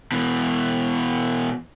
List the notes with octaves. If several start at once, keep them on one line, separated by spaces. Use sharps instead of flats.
B2 E3